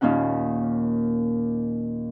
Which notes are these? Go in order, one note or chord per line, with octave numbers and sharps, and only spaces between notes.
D#2 A#2 A#3 C#4 D#4 F#5